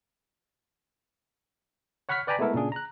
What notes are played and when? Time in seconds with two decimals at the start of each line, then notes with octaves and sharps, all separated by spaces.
2.09 C#5 F#5 B5 C#6 F6 B6
2.27 B4 D5 G5 G#5 A#5 B5
2.39 G#3 A3 B3 E4 A4 A#4
2.54 A#2 C#3 D4 G#4
2.72 A#5 F#6